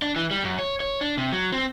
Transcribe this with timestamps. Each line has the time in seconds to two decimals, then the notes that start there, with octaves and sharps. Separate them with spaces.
0.02 D4
0.16 E3
0.31 G3
0.44 F#2
0.59 C#5
0.80 C#5
1.01 D4
1.18 C3
1.33 F#3
1.52 C4